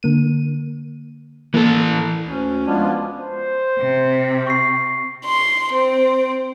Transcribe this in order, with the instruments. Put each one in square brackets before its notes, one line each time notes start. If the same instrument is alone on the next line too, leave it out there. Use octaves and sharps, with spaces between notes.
[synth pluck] D3 A#3 D#7
[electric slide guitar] E3 A4 [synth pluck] A#3
[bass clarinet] D2 [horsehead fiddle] C#4
[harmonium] F3 B3 F4 [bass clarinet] G#3 [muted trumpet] D4
[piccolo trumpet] C5
[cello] C3
[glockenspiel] C#6 C7
[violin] C6
C4